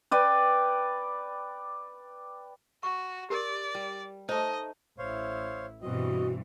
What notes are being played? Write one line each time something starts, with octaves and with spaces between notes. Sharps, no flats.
B4 D5 G5
F#4 C#6
G4 A#4 D5
G3
A3 D#4 C5 D#5
A1 E4 C5 C#5 F5
G2 B2 E3 C4 F#4 D#5